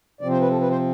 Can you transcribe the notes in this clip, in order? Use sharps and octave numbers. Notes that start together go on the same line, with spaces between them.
C3 F3 C4 D5
C5
B4
A4
B4
C5